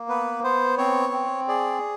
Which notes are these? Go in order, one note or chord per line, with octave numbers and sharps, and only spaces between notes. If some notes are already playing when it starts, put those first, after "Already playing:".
Already playing: A#3
B3 B4
B3 C5
C4 C#5
C4
G#4 D5